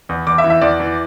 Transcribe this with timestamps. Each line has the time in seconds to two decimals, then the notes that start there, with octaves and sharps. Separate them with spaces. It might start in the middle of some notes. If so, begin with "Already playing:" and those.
0.09 E2
0.27 E2 D6
0.38 E5
0.44 E3
0.50 E5
0.61 E2 D5
0.80 E3